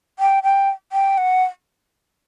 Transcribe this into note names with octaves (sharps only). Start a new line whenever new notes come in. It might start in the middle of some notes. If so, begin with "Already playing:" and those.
G5
G5
G5
F#5